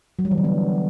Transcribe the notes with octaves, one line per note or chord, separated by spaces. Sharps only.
F#3
G3
E3
D3
B3